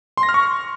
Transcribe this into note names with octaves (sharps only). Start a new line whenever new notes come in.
C6
A#6
F6
C#6